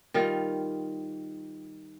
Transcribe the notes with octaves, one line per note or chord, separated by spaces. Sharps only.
D#3 G3 F4